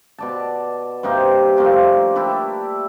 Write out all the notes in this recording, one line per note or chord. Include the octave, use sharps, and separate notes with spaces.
B2 D5 A5
G2 C3 A#3 D#4
F3 A3 A#3 D4
D4 E4 G4